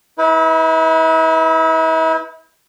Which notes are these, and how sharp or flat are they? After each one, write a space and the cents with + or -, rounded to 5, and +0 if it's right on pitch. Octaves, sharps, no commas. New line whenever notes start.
E4 -40 B4 +0